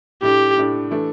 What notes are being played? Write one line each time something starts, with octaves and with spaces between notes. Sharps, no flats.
A2 A3 D4 G4
A2 A3 D4
E3 A3 D4